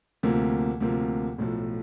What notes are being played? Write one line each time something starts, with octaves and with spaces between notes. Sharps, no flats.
D2 C3 F3 A#3
D2 C3 F3 A#3
B1 A2 F3